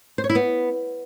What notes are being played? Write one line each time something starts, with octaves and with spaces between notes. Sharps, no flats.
C5
C#5
E4
B3